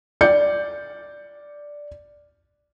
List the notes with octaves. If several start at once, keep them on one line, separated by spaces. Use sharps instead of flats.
D5 G6 C#7